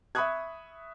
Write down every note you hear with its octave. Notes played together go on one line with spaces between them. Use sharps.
E5 B5 C#6 D#6 F#6 G#6